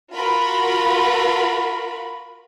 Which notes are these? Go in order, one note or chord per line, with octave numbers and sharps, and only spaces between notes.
F4 F#4 A#4 B5